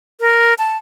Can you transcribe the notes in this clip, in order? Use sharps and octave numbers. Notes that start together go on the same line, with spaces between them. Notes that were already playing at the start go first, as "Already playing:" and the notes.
A#4
A5